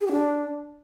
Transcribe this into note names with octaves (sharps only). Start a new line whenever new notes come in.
G#4
G4
D4